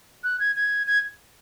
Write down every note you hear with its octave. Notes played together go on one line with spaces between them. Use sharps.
F#6
G#6
G#6
G#6